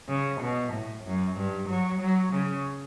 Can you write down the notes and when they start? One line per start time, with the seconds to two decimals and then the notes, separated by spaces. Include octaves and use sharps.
0.09 C#3
0.41 B2
0.73 A2
1.05 F#2
1.37 G2
1.69 F#3
2.01 F#3
2.33 C#3